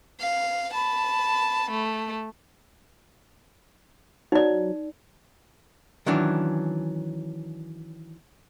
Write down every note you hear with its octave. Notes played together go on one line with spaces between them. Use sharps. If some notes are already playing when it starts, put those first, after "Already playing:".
F5
A5 B5
A3
F#3 D#4 D5
D#3 E3 F#3 C#4 D4